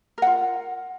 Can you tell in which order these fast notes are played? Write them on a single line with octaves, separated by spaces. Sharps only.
A#4 F#5 F4